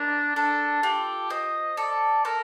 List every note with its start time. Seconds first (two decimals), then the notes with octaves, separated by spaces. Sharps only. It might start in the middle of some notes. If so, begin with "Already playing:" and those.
Already playing: D4 A#4 D#5
0.36 D4 A4
0.83 F4 G4
1.30 C5 D#5
1.77 A4 D5
2.25 A4 A#4